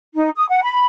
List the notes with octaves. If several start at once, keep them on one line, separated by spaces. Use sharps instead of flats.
D#4
D#6
F#5
B5